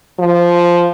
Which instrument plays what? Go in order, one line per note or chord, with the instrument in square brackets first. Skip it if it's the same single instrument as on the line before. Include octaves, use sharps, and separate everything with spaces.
[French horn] F3